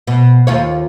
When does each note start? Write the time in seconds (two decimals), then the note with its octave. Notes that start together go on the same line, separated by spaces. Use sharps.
0.07 B2
0.47 D#2 F4 C#5